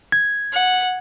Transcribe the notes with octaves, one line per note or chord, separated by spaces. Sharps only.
G#6
F#5